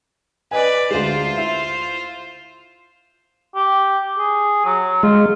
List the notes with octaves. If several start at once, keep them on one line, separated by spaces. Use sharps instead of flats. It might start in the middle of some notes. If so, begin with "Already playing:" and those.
B4 D5 D#5 G#5
D2 G#3 F4 C5
E4 E5
G4
G#4
F#3
G#3 F4